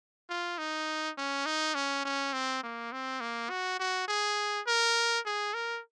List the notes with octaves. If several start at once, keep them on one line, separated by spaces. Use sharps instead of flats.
F4
D#4
C#4
D#4
C#4
C#4
C4
A#3
C4
A#3
F#4
F#4
G#4
A#4
G#4
A#4